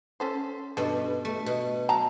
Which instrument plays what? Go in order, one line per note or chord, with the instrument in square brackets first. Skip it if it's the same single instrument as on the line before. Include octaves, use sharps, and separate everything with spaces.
[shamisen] C#4 A4 C5
[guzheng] G2 B2 [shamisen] A4
[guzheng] A3
B2
[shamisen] F#3 A5 A#5